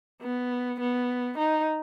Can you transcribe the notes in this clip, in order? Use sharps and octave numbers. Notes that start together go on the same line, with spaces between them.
B3
B3
D#4